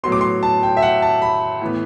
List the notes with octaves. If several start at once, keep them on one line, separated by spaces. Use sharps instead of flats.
A2 F#3 B3 C6
D6
C6
A5
G5
E5
F#5
A5
B5
A2 E3 B3